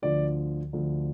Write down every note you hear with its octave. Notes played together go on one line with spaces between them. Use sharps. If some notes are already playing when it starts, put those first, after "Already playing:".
D2 D3 F3 D5
D2 D3 F3